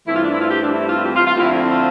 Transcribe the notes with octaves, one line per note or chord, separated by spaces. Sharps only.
G2 E3 A3 C4 E4
F4
D4
E4
F4
G4
D4
E4
F4
G4
F4
F4
F2 D3 F3 A3 C4 E4
E4
F4